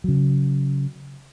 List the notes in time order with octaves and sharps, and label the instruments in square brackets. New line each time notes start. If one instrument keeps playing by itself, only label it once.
[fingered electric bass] C#3 F#3